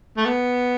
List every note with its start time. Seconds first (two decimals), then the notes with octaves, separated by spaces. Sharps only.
0.17 A3
0.26 B3